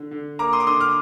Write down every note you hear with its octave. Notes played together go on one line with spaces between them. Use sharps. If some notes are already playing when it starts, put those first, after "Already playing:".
Already playing: D3
D3
A#3 A#5 D6
C6 D#6
D6
D3 C6 D#6
D6 F6